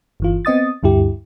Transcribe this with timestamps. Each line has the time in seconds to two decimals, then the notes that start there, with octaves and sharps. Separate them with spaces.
0.20 G1 E3 F4
0.45 B3 C4 D#5 D#6 A6
0.83 D2 G2 E4 G4